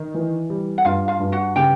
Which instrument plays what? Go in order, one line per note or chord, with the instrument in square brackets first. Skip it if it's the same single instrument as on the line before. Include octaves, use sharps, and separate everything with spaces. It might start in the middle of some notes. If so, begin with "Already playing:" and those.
Already playing: [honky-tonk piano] D#3
E3
G3
[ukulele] F#5
[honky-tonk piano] G2 [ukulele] F4 F5
[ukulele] F4 F5
[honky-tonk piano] G2
[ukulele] F#4 F#5
[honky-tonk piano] C#3 [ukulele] G4 G5